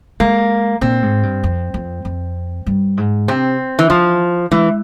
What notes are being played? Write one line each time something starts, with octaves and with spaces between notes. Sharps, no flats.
G#3 A#3
A#2 C4
G#2
G2
F2
F2
F2
G2
G#2
C3 C4
E3
E3 F3
E3 G#3